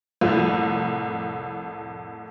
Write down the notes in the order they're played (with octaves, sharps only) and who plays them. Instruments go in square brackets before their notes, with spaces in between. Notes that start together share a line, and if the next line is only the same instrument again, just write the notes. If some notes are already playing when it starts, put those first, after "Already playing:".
[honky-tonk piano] C2 F2 A2